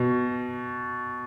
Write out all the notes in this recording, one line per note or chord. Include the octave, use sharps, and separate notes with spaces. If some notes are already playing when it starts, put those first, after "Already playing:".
Already playing: B2